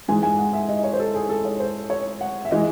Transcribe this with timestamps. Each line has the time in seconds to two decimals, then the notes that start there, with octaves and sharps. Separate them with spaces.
0.08 G#2 E3 G#3 G#5
0.23 G#5
0.39 F#5
0.53 E5
0.69 D#5
0.84 C#5
0.93 C5
1.00 A4
1.15 G#4
1.29 A4
1.45 C#5
1.60 C5
1.90 C#5
2.21 F#5
2.45 E5
2.51 E3 G#3 D#5